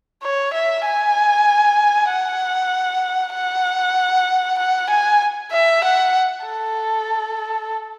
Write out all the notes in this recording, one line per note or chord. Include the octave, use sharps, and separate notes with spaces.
C#5
E5
G#5
F#5
F#5
F#5
G#5
E5
F#5
A4